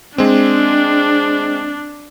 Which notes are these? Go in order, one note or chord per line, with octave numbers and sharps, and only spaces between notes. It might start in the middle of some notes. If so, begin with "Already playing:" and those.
G#3 C4 D4